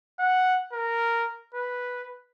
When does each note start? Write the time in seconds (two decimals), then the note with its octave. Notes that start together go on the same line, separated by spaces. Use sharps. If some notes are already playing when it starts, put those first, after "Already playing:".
0.20 F#5
0.73 A#4
1.54 B4